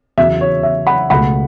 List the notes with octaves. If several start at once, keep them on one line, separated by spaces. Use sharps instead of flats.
E2 C#3 F#3 E5
C#5
E5
F#5 B5
C#2 B2 A3 F#5 B5